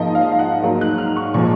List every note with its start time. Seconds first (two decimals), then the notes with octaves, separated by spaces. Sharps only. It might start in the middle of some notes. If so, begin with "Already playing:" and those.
Already playing: G#2 F3 A#3 D#5
0.15 F5
0.32 F5
0.39 F#5
0.62 G#2 F#3 A#3
0.81 F#6
0.98 F6
1.16 C#6
1.34 A#2 F3 G#3 C#6